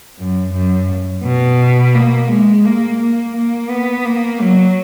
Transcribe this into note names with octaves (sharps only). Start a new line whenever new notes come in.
F#2
F#2
B2
A#3
G#3
A#3
A#3
A#3
B3
A#3
F#3